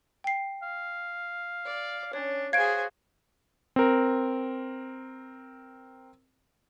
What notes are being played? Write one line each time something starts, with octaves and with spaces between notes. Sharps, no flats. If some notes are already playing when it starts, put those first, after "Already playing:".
G5 C7
F5
D5
C#4 D4 C#5
F#4 G#4 C5 F5 G#6 D7
C4 A#4